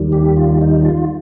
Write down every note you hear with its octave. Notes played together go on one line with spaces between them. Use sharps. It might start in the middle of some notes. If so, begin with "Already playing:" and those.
Already playing: D#2 D#3 G3
G4
F4
D#4
F4